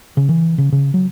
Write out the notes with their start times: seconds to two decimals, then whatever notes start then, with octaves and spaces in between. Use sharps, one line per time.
0.17 C#3
0.29 E3
0.58 C#3
0.72 C#3
0.94 F#3